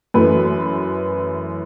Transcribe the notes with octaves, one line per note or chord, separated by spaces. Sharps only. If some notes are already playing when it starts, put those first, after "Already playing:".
F#2 E3 A3 B4